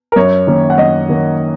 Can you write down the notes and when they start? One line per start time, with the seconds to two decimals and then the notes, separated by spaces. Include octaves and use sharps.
0.12 A#4
0.16 F#2 C#5
0.47 D#3 A#3 C#4
0.70 F#5
0.78 F#2 D#5
1.09 D#3 A#3 C#4